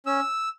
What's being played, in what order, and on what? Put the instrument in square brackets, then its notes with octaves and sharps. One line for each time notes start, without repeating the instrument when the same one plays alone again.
[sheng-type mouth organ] C#4 E6